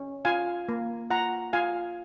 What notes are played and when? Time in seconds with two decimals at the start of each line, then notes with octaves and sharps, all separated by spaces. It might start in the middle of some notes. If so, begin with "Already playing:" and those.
Already playing: C#4
0.25 F4 F5 G#5
0.69 A#3
1.10 F4 F#5 A#5
1.53 F4 F5 G#5